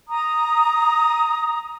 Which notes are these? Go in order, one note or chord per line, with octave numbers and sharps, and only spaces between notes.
A#5 D#6